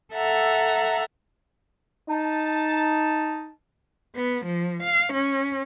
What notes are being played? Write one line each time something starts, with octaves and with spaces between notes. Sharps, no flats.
A4 E5 F#5 A#5
D#4 A5
B3
F3
F5
C#4